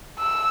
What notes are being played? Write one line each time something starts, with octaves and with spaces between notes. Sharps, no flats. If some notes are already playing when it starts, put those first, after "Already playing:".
E6